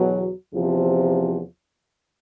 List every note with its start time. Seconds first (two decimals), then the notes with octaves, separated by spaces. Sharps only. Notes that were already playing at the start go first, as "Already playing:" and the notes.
Already playing: E2 B2 F#3
0.52 E2 C3 F3